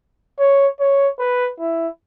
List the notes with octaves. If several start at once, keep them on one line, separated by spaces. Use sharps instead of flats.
C#5
C#5
B4
E4